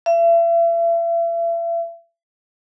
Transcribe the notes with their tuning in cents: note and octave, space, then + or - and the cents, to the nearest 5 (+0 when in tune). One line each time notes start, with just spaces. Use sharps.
E5 +40